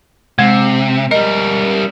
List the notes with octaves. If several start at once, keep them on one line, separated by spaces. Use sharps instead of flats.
C3 G#3
G3 A#4 D#5